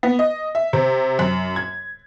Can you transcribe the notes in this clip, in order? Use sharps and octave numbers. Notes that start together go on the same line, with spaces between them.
B3
D#5
E5
C3
F#2
G#6